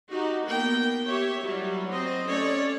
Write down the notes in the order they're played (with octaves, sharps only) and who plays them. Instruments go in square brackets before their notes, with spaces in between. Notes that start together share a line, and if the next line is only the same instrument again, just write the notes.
[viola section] D#4 F#4 G4
A#3 B3 A#4 G5
G4 C#5 E5
F#3 G3 E4
C4 C5 D#5
A3 C#4 A4 C#5 D5